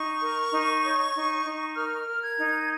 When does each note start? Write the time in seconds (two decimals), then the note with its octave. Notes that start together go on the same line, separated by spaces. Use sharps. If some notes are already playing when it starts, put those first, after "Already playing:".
Already playing: D#4 C#6
0.21 A#4
0.53 D#4
0.84 C#5
1.14 D#4
1.45 D#4
1.75 A#4 F6
2.07 A#4
2.22 G#6
2.38 D#4